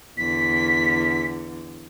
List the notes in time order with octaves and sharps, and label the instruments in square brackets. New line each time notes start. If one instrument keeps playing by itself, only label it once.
[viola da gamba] E2 D3 [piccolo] B6